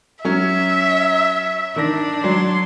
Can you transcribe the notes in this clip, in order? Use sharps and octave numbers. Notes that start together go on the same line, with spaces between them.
F#3 C#4 E5
D#3 D4 A#6
F#3 C6